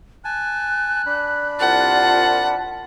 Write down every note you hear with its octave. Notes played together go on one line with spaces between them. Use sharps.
G#5 A5 F#6
D4 B5
C2 F4 F#5 A5